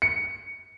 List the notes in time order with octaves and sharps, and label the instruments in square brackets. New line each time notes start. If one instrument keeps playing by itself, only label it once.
[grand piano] C#7